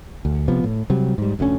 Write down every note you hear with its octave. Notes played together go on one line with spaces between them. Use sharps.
D2
C3 F3 B3
A2
C3 F#3 G3
G#2 G3
F1 D2 D3 C#4